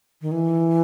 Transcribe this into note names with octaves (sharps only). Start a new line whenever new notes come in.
D#3
E3